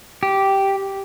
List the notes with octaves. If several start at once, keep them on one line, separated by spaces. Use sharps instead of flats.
G4